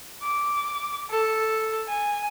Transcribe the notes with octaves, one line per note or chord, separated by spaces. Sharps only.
D6
A4
G#5